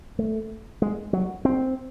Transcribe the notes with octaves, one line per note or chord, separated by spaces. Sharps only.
A3
G#3
F#3
C4